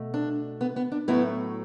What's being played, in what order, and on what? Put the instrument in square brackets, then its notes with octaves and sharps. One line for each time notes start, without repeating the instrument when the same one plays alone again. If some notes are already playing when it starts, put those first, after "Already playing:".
Already playing: [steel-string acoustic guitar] B2 A3
D4
B3
B3
D4
A2 F#3 A3 B3 E4